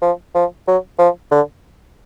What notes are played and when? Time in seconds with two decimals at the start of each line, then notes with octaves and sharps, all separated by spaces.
0.02 F3
0.35 F3
0.67 F#3
0.99 F3
1.31 D3